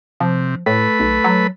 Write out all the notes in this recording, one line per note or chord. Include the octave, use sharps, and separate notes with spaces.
C3 F3
A2 A3 B4 B5
B1
F#3